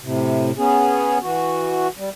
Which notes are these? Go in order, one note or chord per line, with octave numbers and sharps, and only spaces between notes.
A2 C3
B3 C#4 G#4
E3 F#4
G3